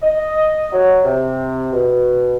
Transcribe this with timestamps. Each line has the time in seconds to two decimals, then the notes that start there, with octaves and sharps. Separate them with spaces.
0.02 D#5
0.72 F#3
1.04 C3
1.72 B2